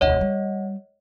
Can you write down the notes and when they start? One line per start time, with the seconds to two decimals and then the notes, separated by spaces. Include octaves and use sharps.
0.01 E1 D2 C#5 D#5 F#5
0.21 G3